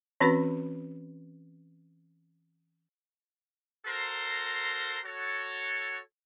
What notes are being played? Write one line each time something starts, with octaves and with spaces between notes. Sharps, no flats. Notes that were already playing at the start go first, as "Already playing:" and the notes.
E3 C4 C#4 F#4 B4 B5
F#4 A4 A#4 C5 A#5 C6
F#4 A4 C#5